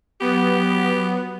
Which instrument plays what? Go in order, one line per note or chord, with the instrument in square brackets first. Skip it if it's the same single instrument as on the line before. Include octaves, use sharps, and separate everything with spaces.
[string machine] F#3 [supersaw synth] B3 [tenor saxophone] G4